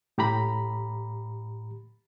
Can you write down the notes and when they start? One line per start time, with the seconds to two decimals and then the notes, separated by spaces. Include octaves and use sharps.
0.18 A2 G4 A#5 B5